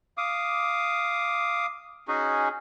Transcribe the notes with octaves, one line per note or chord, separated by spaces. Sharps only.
F5 D6 D#6
C#4 D#4 F#4 G#4